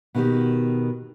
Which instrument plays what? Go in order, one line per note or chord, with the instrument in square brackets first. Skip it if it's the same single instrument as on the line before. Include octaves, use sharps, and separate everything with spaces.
[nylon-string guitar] B2 D#3 G4